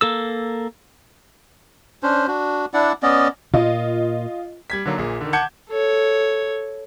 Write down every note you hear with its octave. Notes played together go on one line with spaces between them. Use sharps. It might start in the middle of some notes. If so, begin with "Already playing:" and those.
A#3 A4 E6
C#4 D4 C5
D4 F#4
D4 E4 D5 F#5
B3 C#4 D5 D#5
A#2 F4 D#5
G3 G#6 B6
D3 D#3 F#3 A#3
A#1 A#2 G#4
D3 D#3
F#5 A5 D6 G6 G#6 C#7
A4 C#5